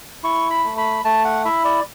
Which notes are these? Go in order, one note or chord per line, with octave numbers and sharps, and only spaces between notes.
E4 C#6
B5
A3
B5
A3 A5
F#5
E4 E5
D5